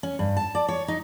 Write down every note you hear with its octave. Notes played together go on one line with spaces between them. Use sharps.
C#4
G2
A5
D5
C#5
D#4